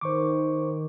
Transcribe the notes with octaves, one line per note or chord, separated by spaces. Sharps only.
D#3 C5 C#6 D6